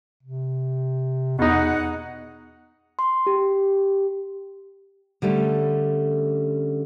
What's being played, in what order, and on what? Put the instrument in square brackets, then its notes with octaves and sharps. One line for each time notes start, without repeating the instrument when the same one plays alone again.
[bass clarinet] C3
[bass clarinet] E2 [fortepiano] B2 D#4 [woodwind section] G#4 D#5 F#5
[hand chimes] C6
G4
[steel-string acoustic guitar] D3 G3 A3 C#4